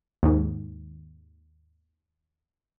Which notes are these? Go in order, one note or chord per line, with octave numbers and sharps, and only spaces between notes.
D#2 G#2